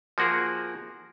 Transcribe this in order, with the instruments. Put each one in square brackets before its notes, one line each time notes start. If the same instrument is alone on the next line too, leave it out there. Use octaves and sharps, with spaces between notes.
[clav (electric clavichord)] F3 A#3 F#4 G#4 A#4